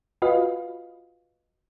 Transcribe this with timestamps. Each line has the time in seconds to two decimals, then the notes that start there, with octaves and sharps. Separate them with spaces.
0.22 F4 F#4 B4 D#5 F5